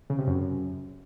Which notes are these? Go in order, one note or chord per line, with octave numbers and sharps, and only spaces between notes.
C#3
C3
F#2